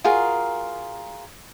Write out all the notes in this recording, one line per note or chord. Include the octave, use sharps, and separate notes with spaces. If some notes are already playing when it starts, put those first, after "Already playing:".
F4 F#4 G#4 A#4